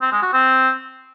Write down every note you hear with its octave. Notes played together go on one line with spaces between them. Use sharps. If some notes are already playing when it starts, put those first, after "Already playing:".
C4
G#3
F#4
C4